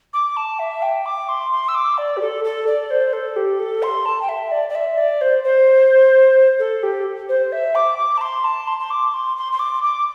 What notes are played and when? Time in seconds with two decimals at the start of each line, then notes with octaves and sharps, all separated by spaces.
0.13 D6
0.37 A5
0.59 E5
0.82 G5
1.06 D6
1.29 C6
1.52 C6
1.68 E6
1.75 D6
1.98 D5
2.17 G4
2.21 A4
2.44 A4
2.67 D5
2.91 C5
3.13 A4
3.36 G4
3.60 A4
3.83 C6
4.05 A5
4.22 G5
4.29 E5
4.51 D5
4.69 D5
4.75 E5
4.98 D5
5.21 C5
5.44 C5
6.59 A4
6.83 G4
7.29 C5
7.52 E5
7.75 D6
7.98 D6
8.17 A5
8.21 C6
8.44 A5
8.67 C6
8.80 C6
8.90 D6
9.14 C6
9.37 C6
9.52 C6
9.60 D6
9.83 D6